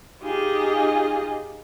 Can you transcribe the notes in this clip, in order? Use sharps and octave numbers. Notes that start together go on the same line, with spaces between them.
D#4 F4 G4 G#4 D#5